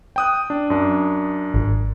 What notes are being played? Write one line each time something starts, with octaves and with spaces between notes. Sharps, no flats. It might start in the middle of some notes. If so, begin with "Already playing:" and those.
G5 D#6 F#6
D4
F#2 D4
G#1